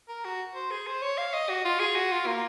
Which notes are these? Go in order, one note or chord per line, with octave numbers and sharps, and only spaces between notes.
A#4
F#4
C5
G#4
C5
C#5
F5
D#5
F#4
F4
G#4
F#4
F4
A#3